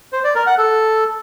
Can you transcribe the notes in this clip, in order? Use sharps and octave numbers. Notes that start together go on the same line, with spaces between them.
C5
D5
A#4
F#5
A4